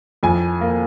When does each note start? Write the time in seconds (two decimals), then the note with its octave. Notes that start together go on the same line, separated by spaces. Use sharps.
0.23 F2 G#5
0.61 A#3